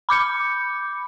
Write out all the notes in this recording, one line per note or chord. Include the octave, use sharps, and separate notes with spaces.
B5 D6 G6 C#7